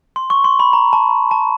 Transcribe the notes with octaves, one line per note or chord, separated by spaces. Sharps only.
C6
C#6
C6
B5
A#5
A5
A5